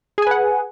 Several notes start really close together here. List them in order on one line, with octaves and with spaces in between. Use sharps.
G#4 G#5 B4 F#5